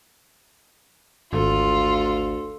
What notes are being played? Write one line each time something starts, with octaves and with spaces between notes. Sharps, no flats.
G#1 D2 F4 A4